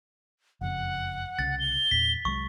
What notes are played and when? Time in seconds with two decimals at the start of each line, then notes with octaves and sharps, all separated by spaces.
0.61 F#1 F2 C#3 F#5
1.39 C2 C#3 A6
1.60 G7
1.91 E2 A#2 B6
2.25 C2 F#3 G#3 C#6